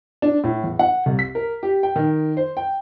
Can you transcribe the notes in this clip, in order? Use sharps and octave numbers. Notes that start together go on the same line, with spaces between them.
D4
A2
E2
F#5
C2
B6
A#4
G4
G5
D#3
C5
G5